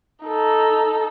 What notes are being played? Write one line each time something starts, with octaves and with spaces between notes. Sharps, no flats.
D#4 A4